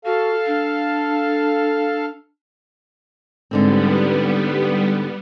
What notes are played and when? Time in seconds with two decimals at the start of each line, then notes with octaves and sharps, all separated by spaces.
0.05 F#4 A4 F5
0.46 D4
3.51 G#2 D3 G3 B3 C4